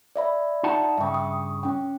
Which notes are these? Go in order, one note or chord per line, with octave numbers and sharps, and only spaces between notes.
D5 E5 B5
D#4 F#5 A5
G2 C#3 E5 G5
D#6
C#4 G5